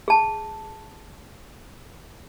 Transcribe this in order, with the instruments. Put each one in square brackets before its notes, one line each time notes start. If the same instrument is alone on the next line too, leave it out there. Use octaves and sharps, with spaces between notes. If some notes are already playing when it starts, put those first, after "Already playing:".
[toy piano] G#4 A5